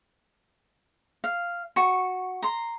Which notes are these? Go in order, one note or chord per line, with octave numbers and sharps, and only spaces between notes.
F5
F#4 C#6
A#5 C6